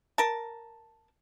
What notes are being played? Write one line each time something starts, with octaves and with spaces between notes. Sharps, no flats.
A#4 A5